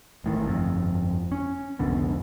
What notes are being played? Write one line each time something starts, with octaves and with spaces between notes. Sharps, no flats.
A1 A2 D#3
G1 F2
C#4
C2 F2 D3 B3